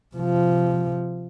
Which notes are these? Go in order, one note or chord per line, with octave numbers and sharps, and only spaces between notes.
C3 F3